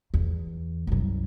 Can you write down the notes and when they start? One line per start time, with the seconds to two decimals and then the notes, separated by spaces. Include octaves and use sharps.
0.14 E2
0.87 C2 F#2